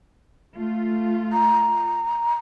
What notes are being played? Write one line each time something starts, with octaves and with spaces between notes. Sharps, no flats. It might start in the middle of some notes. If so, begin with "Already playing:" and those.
A3 F4
A#5